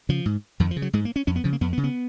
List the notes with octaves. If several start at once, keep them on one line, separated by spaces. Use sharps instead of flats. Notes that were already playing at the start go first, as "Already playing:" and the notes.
C#3 F3
G#2
F2 D#3
F3
C#3
F#3
G#2 G#3
A#3
C#4
F2 C#4
B3
C#3 F3
A#3
F2 B3
B3
C#3
B3